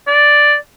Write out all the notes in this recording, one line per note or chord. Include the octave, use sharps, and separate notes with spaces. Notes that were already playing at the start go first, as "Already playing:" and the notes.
D5